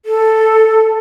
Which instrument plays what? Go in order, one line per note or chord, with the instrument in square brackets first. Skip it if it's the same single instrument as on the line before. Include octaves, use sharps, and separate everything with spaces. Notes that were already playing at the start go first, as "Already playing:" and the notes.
[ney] A4